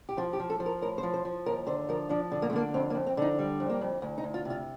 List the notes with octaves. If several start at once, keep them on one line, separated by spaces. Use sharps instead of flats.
G4
F3 F4
G4
F3
A4
F3
A#4
A2 A#4
C5
F3
C5
F3
D#2 A#4
D3 C5
F3 A#4
F3 D4
D3
A#3
A3
D3 A#3
F2 C4
A#3
F2
C4
D3 D#4
G3
F2
A#3
F2
D2
D#4
D2
F4
C3 F4